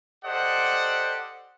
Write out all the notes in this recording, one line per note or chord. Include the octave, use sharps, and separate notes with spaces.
G4 A4 C5 D5 D#5 F#5